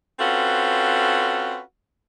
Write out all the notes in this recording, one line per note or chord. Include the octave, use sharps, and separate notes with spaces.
C4 C#4 F4 F#4 A4 B4